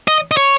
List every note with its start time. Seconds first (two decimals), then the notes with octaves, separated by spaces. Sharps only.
0.08 D#5
0.31 D#5
0.37 C#5